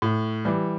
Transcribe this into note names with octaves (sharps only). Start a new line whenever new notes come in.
A2
E3 G3